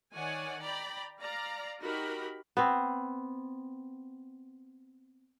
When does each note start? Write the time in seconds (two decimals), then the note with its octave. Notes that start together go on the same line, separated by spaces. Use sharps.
0.14 D#3 C#5 D5 F#5 G#5
0.61 D5 G5 A#5 B5
1.21 D5 F5 A#5
1.83 D#4 F#4 G4 A#4 B5
2.57 B3 C4